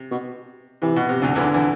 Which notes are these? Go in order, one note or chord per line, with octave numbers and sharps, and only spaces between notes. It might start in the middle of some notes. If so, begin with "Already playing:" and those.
Already playing: C3
B2
C3 E3
B2
C3
D2 D3
E2 D3 E3
E3